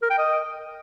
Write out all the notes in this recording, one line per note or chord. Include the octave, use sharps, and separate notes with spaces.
A#4
G5
D#5